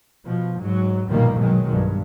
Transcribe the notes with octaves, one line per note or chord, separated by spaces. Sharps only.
B2 F3
G#2 F#3
A#1 G2 B2 D#3 G3 A#3
B2 D#3 F#3 G#3
B1 G2